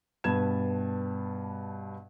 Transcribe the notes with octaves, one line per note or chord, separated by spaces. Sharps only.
G2 B2 B4 A5 G#6 E7